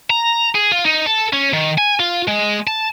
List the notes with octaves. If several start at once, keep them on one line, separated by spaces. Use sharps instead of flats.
A#5
G#4
F4
D#4
A4
C#4
D#3
G#5
F4
G#3
A5